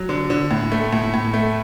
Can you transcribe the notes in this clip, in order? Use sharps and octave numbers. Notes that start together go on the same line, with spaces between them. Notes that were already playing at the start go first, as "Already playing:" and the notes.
Already playing: F#3
D3
D3
A2
A3
A2
A2
A3